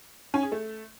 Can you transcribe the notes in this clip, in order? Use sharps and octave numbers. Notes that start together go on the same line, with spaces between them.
C#4
G#4
A3